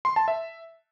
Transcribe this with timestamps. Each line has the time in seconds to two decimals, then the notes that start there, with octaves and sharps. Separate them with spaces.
0.05 C6
0.16 A5
0.28 E5